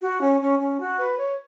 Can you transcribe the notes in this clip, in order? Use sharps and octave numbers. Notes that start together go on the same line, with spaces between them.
F#4
C#4
C#4
C#4
F#4
B4
C#5